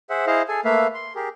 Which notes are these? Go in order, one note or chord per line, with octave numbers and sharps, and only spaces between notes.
G#4 C5 E5 F#5
E4 G#4 C5 D#5 F5
G#4 A4 G#5
A3 A#3 B4 E5 F5
C6
G4 G#4 A#4